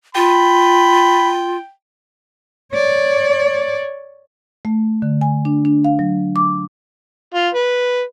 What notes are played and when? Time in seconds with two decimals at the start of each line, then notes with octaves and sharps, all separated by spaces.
0.15 F4 G5 B5
2.72 C#5 D5
4.65 A3
5.02 D3
5.21 G#5
5.45 D4
5.65 D4
5.85 F5
5.99 F#3
6.36 D6
7.34 F4
7.54 B4